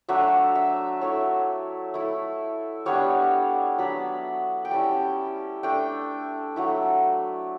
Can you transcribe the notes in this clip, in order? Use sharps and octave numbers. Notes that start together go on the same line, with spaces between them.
F#3 A3 D4 E5
E5
F#3 A3 E4 C#5
A3 E4
G3 B3 D4 C#5
F#3 B3 D4 B5
G5
G3 C#4 E4 A5
A3 D4 G5
F#3 A3 E4